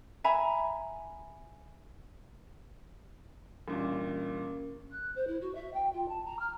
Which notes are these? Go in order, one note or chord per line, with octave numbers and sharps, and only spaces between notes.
E5 G#5 A#5 B5
A1 G2 A#2 C#4 A#4
F#6
C5
E4
F#4
E5
G5
F4
A5
A#5
F6